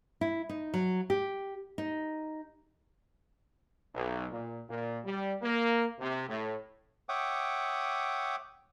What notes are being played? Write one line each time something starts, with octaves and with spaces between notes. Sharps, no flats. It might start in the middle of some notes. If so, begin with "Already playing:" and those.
E4
D#4
F#3
G4
D#4
B1
A#2
A#2
G3
A#3
C3
A2
C#5 E5 F#5 G5 D6 D#6